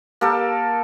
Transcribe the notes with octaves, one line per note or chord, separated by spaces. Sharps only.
A#3 G4 A4 A#4